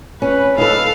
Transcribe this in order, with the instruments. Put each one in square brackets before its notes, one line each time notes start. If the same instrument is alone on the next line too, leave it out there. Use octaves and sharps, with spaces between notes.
[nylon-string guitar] C#4 [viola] B4
[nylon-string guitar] D#4 B4 [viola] A4 F5